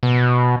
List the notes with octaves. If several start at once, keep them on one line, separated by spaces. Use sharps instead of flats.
B2